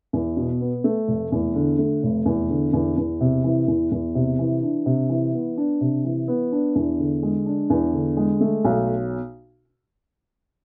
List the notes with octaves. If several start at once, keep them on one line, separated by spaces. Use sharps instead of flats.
E2
B2
B3
A3
F1
E2
D3
A3
F1
E2
D3
E2
E2
C3
E3
E2
E2
C3
E3
D4
C3
E3
B3
D4
C3
E3
B3
D4
E2
D3
G#3
D4
E2
D3
G#3
A3
B1